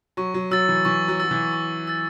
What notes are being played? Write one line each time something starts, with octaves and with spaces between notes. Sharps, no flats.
F#3 C#6
F#3
F#3 E6 A6
E3
E3 C#6
F#3
F#3 E6 A6
E3
C#6
E6 A6